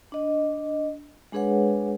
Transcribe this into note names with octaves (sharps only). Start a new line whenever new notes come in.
D4 D#5
G#3 D4 G#4 B4 C#5 F#5